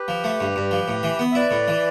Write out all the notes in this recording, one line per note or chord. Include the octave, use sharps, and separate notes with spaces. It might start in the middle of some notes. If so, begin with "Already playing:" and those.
Already playing: G4 B4
F3
A3
G2
G2
F3
A2
E3
B3
E5
E4 B4 D5
A2
E3